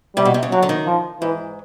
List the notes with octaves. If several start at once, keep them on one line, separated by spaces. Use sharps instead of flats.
C3 G3
B2
C3
C#3
D3 F#3
D3
D#3
F3
G#2 E3